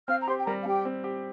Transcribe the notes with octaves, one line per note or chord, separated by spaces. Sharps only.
C4 F5 F6
A#5
G4 C5 C6
G5
G3 A#4 A#5
F5
G3 G4 G5
C4
G4